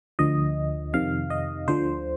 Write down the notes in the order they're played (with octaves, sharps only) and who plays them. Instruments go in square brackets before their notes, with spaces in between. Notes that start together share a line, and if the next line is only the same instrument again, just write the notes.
[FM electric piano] D2 D3 F3 D#5
F2 C3 D#3 F5
D#5
D2 D3 F3 C5